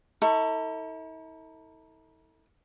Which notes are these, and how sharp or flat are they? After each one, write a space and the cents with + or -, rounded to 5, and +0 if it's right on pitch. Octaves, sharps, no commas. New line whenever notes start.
E4 -45 A4 +30 C#6 +0